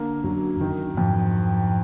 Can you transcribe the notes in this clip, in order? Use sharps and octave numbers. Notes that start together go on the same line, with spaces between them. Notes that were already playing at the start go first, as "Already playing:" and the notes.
Already playing: D3 A#3
F#2 F#3
F#2 D#3
F2 G#2